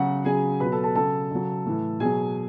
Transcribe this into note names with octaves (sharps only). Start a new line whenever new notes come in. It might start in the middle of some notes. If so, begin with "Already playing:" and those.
Already playing: C#3 F#3 F#4 F#5
C#3 F#3 G#4 G#5
B2 F#3 B4 B5
A4 A5
A4 A5
C#3 F#3 A4 A5
C#3 F#3
A2 E3
B2 F#3 G#4 G#5